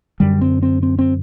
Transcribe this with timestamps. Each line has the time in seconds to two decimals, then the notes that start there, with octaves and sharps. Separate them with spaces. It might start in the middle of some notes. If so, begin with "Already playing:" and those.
0.20 F#2 D3 G3
0.41 C4
0.63 C4
0.83 C4
0.99 C4